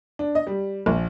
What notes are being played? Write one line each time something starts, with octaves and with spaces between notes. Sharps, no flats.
D4
D#5
G3
A#1